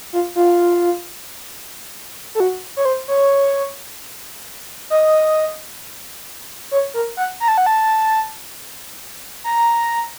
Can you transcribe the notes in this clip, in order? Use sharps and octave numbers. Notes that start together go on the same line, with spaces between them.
F4
F4
A4
F#4
C#5
C5
C#5
D#5
C#5
A#4
F#5
A#5
A5
F#5
A5
A#5